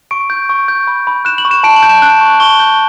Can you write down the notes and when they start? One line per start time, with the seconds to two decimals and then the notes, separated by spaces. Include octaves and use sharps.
0.11 C#6 D7
0.30 G6
0.49 C#6
0.68 G6
0.87 B5
1.07 B5
1.25 F#6 E7
1.38 F#7
1.45 C#6
1.51 E7
1.64 A5 D7
1.76 F#7
1.83 G6
1.89 E7
2.02 F#6 F#7
2.21 C#6
2.40 C#6 G7
2.60 G6